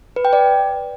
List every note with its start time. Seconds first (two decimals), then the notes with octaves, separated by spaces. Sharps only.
0.16 B4
0.25 G5
0.33 D5